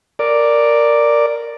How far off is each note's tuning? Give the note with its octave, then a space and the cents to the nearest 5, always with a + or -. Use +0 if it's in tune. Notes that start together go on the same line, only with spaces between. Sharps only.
A#4 +0 D5 +0